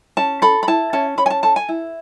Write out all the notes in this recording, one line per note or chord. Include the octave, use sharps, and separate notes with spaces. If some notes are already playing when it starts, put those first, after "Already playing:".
C#4 A5
A4 B5
B5
E4 A5
C#4 A5
C#4 B5
G#5
A5
A4 A5
G#5
E4